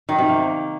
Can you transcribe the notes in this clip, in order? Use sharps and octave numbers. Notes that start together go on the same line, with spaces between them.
D#3
C3
A#3